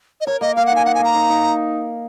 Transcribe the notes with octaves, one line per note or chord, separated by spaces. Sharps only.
D#5
A#4 C#5
A#3 D#5
A#3 F5
F#5
D#4 G#5
D#4 F#5
G#5
A#3 A#5
D#4
D#4